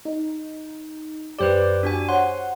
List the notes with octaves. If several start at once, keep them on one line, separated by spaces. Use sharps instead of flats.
D#4
F#2 G4 B4 C5 D5 D6
D4 F#4 G#5
C5 C#5 F#5 C6